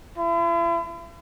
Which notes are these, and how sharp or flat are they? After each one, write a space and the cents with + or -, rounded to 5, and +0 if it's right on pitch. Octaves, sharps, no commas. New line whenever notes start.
E4 +40